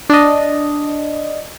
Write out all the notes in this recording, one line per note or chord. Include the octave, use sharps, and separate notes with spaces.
D4 D5 D#5